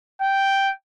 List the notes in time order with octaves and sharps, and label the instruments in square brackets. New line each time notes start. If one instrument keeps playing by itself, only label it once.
[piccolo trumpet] G5